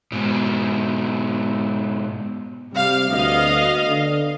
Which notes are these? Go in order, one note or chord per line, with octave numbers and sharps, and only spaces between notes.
G#2 B2
C3 G3 F5
D2 B3 D#5 F5
D3